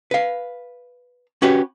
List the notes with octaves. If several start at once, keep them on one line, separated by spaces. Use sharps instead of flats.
B4 F5
C#4 F#4 G4 B4 C#5